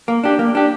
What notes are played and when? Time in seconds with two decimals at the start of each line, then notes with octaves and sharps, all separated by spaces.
0.08 A#3
0.24 D4 G4
0.39 A#3
0.55 D4 G4